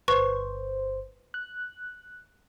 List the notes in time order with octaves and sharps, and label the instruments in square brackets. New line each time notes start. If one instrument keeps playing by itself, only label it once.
[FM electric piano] G1 C5 [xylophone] B4 C#6
[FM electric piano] F#6